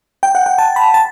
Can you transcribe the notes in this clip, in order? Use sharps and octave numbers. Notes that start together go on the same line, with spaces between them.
G5
F#5
G5
A5
B5
A5